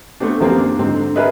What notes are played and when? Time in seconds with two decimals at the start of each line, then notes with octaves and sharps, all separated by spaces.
0.20 A3 B3 C4 D4
0.40 F#2 F3 G3 A#3 C4
0.59 D4
0.79 G#2 D3 C4
1.16 G#4 A#4 B4 D#5 E5